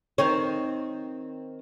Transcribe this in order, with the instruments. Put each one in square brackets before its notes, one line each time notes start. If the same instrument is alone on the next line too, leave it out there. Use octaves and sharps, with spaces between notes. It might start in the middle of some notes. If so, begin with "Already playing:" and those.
[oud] D#3 C4 C#5